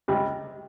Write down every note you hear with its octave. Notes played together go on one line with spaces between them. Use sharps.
C#2 C3 G3